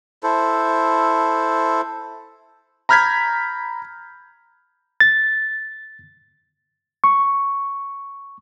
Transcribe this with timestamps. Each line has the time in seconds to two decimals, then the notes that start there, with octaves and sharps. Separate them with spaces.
0.23 E4 A4 C5
2.89 A#5 B5 F6 G6 G#6 B6
5.00 A6
7.04 C#6